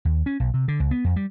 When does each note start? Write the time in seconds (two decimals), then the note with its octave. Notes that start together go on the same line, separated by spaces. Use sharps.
0.05 D#2
0.26 C#4
0.40 B1
0.54 C3
0.68 D3
0.80 C#2
0.91 B3
1.04 F2
1.16 G3